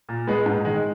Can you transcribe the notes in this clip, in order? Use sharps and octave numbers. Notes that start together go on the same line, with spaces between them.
A#2
G#3 B3
G#2
D#3 G#3